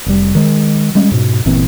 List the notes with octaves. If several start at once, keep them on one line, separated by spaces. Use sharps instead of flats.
F1 G3
D#3 G#3
G3 G#3 C#4
G#2 B2
G1 A#2 E3 C4